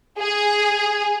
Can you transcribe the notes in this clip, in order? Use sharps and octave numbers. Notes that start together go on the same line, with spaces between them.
G#4